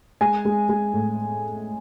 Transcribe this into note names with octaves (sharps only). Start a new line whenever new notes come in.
G#3 G#5
G#3
G#3
A2